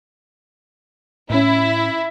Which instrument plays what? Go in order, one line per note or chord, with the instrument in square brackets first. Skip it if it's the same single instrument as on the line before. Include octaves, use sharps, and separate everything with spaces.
[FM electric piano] A2 C#4 [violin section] E4